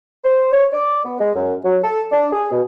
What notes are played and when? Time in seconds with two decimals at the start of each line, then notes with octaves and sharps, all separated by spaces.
0.24 C5
0.52 C#5
0.72 D5
1.04 B3
1.20 G#3
1.35 F#2
1.64 F#3
1.83 A4
2.12 D4
2.33 G#4
2.51 B2